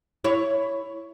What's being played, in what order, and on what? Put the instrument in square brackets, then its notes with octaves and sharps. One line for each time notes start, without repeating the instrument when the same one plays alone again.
[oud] E4 C#5